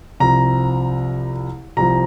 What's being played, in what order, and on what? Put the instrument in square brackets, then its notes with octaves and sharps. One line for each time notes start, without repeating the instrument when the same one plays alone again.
[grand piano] C2 C3 F3 A#5
C2 C3 F3 A#5